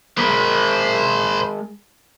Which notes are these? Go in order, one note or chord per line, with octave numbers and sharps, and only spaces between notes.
G#3 A#4 C5 B5